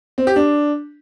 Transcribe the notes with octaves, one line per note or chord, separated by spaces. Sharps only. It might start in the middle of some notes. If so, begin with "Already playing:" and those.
C4
G4
D4